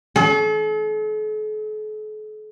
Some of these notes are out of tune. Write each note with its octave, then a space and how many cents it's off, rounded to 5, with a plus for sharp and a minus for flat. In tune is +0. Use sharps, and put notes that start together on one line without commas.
A4 -45